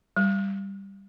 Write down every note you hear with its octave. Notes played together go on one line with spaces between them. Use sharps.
G3